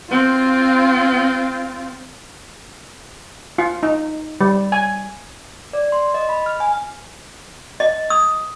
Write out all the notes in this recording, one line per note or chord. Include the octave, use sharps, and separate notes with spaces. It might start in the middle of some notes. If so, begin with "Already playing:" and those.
C4 F4
F4
D#4
G3
G#5
D5
C6
D#5
B5
F6
G#5
D#5
D#6